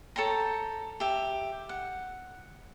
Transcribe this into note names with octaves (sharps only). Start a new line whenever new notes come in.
A4 C#5 G5 A#5
G4 E5
F#5